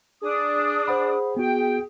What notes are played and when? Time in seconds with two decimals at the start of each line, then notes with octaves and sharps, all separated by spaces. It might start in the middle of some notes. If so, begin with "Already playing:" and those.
0.22 D4 G#4 D#6
0.88 C5 F#5 B5
1.37 B3 F#4 G5